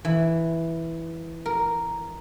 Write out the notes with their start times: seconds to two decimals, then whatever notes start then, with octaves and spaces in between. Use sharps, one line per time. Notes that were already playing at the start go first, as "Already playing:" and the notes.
0.05 E3
1.46 A#4